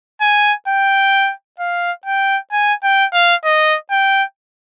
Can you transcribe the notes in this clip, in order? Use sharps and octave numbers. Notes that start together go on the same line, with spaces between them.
G#5
G5
F5
G5
G#5
G5
F5
D#5
G5